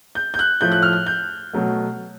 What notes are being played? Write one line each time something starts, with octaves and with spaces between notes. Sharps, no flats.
G6
G6
F#6
A2 F3 A3 G6
F#6
F6
F#6
G6
B2 F#3 A3